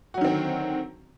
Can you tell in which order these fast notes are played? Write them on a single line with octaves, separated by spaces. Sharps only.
F#4 F#3 D#3 C4 D3